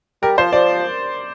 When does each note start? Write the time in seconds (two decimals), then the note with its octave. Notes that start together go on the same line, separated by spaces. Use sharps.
0.22 G3 A#4
0.38 F3 C5
0.53 F3 D5